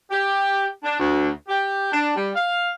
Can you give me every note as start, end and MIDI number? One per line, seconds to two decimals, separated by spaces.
0.11 0.67 67
0.84 0.97 62
0.98 1.30 38
1.48 1.91 67
1.92 2.14 62
2.15 2.30 55
2.35 2.72 77